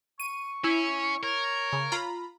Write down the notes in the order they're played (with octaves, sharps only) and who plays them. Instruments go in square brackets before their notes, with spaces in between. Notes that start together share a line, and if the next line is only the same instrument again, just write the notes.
[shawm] C#6 [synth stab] D#7
[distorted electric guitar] C#4 [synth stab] E4
[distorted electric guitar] A#4 [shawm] C#5
[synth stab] C#3
F4 A#5 B5